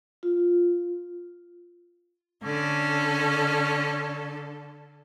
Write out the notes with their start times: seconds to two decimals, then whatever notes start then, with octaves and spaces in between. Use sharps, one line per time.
0.23 F4
2.43 D3 C#4 A4